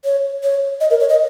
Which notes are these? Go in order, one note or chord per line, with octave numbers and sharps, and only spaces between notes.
C#5
C#5
D#5
A#4
C#5
D#5